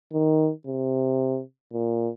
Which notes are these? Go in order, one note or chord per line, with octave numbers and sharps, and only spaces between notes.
D#3
C3
A#2